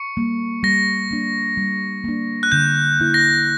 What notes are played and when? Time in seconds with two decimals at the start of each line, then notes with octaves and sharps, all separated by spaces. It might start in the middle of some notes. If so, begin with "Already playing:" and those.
Already playing: C#6 C#7
0.17 G3 A#3
0.63 G3 A#6
1.11 A#3 D4
1.58 G3
2.04 A#3 D4
2.43 F#6
2.52 D3 G6
3.00 A#3 E4
3.14 A#6